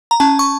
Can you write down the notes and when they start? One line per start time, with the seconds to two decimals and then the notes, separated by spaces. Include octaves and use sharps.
0.11 A#5
0.20 C#4 A5
0.39 C#6